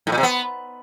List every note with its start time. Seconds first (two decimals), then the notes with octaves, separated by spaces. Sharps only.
0.07 A2
0.12 A#2
0.18 C3
0.23 B3